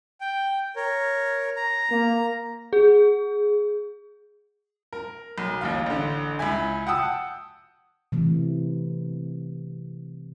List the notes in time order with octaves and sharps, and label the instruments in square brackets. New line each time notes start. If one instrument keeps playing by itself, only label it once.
[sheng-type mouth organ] G5
A#4 C#5
A#5
[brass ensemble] A#3
[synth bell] G#4
[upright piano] A#4
B1
A1 D#2 F5
A1 D3
C#2 E4 E5 G#5
F#5 G5 A5 D#6 E6
[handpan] C3 E3 A3